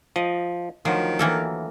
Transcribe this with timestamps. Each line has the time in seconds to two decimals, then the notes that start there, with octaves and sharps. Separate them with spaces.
0.16 F3 D#5
0.85 D2 D#3 F3 F#3
1.19 E3 A#3 A4